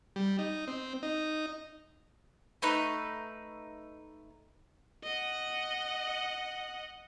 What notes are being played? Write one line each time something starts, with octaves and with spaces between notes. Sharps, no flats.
G3
D#4
C4
D#4
A3 D#4 B4
D#5 F#5